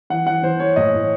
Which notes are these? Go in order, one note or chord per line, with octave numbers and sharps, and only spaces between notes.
E3 F#5
E3 F#5
E3 C5
E3 C#5
A2 D#5
A2